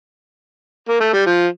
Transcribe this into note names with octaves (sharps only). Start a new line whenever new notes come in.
A#3
A3
G3
F3